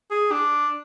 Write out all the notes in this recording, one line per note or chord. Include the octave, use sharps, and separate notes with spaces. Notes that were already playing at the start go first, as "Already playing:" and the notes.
G#4
D4